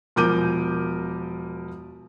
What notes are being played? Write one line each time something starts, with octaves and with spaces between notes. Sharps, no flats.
E1 F3 A#4 D6 G6 D#7